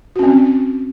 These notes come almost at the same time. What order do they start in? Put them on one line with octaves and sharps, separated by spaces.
F#4 C#4 C4